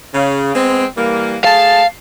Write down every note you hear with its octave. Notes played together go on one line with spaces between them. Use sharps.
C#3
G#3 B3 C4
E3 G3 A#3
A3 G#4 F5 A5